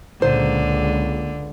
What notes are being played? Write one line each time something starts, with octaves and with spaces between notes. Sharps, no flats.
C#2 A#2 D3 C5